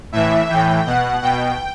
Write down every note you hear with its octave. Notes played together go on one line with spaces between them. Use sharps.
A2 E3 E5
A2 E3 G5
B2 F#5
B2 G5